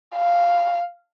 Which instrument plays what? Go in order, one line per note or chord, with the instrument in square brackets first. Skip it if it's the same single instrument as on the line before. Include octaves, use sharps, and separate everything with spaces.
[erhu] F5